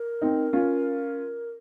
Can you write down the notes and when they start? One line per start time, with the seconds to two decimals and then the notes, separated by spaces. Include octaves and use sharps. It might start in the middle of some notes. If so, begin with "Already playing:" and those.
Already playing: A#4
0.22 C4 D#4
0.53 C#4 F4